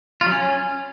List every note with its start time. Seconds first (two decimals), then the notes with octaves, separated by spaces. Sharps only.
0.21 F4
0.26 F#3
0.31 C#4